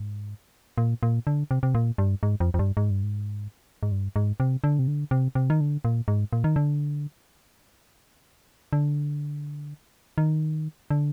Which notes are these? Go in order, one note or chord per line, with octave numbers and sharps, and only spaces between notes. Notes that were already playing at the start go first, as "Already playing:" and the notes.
Already playing: G#2
A#2
A#2
D3
C3
C3
A#2
G2
G#2
F2
F2
G2
G#2
G2
G#2
G#2
G2
G#2
C3
D3
C3
D3
C3
C3
D#3
D3
A#2
G#2
A#2
D#3
D3
D3
D#3
D3